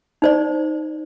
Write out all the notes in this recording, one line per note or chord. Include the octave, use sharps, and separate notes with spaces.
D#4 C5 D5